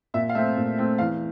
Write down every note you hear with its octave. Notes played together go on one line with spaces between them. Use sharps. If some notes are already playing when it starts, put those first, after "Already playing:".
A#2 E5
F5
A3 C4 E5
A#2
A3 C4
E2 F5